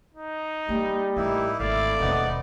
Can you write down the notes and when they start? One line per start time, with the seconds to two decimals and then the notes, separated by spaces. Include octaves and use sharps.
0.15 D#4
0.69 G3 A#3
1.17 A1 A#3 D#4 E4
1.60 G#1 A3 E4 D5 E5 F5
2.00 D#1 G#2 B2 B3 D#4